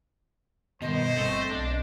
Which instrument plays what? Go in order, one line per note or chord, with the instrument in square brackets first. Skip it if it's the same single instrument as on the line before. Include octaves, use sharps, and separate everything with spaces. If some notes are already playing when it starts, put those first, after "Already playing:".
[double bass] G2 D#3 [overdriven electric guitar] B2 [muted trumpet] C5 [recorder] D#5
[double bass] G1 C4 [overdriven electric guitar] A3
[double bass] B1 [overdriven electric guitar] D4